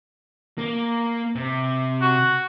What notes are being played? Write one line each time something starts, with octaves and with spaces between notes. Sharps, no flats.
A#3
C3
F#4